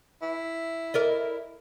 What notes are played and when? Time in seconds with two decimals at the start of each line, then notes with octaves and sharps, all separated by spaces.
0.22 E4
0.94 A#4 D5 D#5